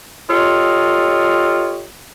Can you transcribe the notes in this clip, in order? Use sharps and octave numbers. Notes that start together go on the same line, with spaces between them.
F4 G4 A4 C#5 D#5